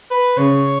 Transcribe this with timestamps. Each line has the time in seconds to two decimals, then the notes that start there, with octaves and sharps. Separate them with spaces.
0.11 B4
0.37 C#3 C#5